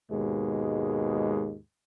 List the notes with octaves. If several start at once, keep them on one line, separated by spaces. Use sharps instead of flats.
D#2 G#2 B2 G#3